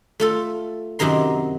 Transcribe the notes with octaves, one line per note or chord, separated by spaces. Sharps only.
A3 F4 A4
F#2 C3 D#3 A#5 C6